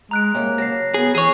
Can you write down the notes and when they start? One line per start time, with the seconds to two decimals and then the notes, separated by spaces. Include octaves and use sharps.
0.11 G#3 A#5 F#6 D7
0.34 C3 G#3 A#3 C#4
0.58 C#3 F#3 A5 A#6 C7
0.94 B3 G#4
1.15 E3 G#4 C#5